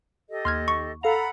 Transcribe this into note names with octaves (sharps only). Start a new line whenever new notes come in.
G4 A4 D#5
D#2 C6 F6 G#6
C#6
A4 F5 F#5 A#5 B5